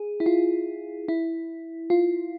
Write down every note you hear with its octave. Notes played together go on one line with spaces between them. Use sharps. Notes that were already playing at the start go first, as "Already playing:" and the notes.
Already playing: G#4
E4
F4
E4
F4